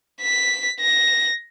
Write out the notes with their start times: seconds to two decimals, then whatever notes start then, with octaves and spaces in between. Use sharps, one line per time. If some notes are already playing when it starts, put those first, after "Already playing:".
0.22 B6
0.80 A#6